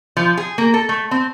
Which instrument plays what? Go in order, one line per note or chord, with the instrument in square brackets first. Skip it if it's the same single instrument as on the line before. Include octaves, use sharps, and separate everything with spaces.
[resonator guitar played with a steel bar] F3
G#4
A#3
A4
A3
C4